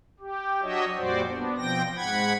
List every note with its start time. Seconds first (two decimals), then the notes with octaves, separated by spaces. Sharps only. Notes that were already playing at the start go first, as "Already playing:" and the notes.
0.20 G4
0.62 F#3 D4 F#4 C#5 D#5 E5
0.97 F2 A#2 G3 F#4 C5 D5
1.27 B3 D4
1.57 B2 F3 C4 G5 A#6
1.96 G#2 F#5 B5 G#6